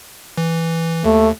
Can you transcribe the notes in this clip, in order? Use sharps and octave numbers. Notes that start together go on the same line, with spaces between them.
E3
D#2 A3